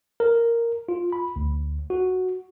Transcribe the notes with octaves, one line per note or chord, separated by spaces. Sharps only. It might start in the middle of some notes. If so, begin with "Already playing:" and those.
A#4
F4
B5
D2
F#4